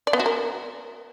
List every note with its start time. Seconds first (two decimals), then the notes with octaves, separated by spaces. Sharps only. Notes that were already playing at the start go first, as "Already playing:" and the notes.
0.07 D5
0.13 B3
0.20 F#4
0.26 A#4